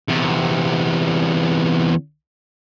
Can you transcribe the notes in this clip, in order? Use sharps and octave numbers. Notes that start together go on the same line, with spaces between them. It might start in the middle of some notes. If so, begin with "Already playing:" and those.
E2 C3